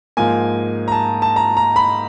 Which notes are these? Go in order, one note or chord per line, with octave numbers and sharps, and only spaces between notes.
G#2 F3 A#3 G#5
A#5
A5
A5
A#5
A#5
B5